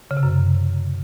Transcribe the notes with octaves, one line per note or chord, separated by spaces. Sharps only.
C#3
C3
F#2